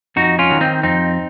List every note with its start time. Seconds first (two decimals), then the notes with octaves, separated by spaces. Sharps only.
0.16 F2 D#4 F#4
0.39 C#4 F4
0.50 D#3 F#3
0.61 C4 D#4
0.83 F2 C4 D#4